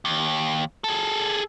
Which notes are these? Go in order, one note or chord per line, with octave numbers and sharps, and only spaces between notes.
D#2
G#4 A4